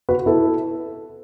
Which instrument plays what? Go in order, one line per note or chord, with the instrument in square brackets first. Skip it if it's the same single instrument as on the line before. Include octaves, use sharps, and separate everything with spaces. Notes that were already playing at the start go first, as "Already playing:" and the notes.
[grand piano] F#4 B4
E4 A4